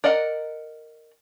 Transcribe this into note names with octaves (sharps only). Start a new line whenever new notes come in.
A#4 D5 D#5 F#5